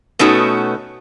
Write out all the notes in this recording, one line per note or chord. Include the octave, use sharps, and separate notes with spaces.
B2 A3 B3 C#4 D#4 F#4